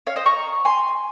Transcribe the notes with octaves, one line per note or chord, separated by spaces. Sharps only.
C#5 F5
C5 D#5
A#5 C#6
G#5 C6